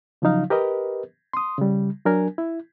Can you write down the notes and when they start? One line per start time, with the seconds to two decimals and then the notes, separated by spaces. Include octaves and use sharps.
0.22 C#3 F3 F#3 D#4 F5
0.50 G4 A#4 B4 D#5
1.33 C6 D#6
1.58 C#3 G3
2.05 F#3 D4 A#4 G#5
2.38 E4